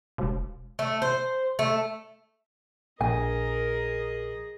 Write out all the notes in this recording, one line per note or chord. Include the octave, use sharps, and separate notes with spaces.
E1
A3
C5
A3
A#1 G#4 A#4 D#5 G#5